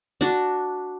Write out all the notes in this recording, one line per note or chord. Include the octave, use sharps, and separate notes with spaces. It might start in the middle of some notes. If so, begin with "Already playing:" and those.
D4 F#4